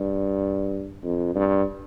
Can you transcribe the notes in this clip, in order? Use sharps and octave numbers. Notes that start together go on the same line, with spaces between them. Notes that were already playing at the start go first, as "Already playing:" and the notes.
Already playing: G2
F2
G2